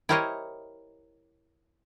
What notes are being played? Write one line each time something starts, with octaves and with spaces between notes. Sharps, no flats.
E4 G4 A#4 C5 C#5 D#5